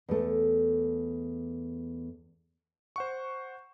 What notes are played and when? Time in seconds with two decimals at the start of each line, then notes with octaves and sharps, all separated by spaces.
0.09 E2 A3
2.96 C5 F#5 C#6